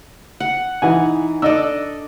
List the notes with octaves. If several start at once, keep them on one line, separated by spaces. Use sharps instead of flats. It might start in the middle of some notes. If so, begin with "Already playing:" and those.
F#5
E3 D#4 F#5 G#5
D4 A4 D5 D#5 E6